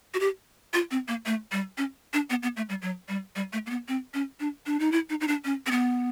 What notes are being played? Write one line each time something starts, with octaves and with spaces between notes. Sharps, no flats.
F#4
G4
F4
C4
A#3
A3
G3
C#4
D4
B3
B3
A3
G3
F#3
G3
G3
A3
A#3
B3
C4
C#4
D4
D4
D#4
E4
D#4
D#4
D4
C#4
C4
B3